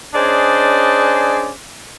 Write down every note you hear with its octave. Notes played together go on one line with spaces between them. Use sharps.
C#4 D4 G#4 C5 D5 D#5